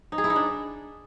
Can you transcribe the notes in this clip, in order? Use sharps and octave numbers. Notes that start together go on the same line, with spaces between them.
D#4
G#4
E4
D#4
D4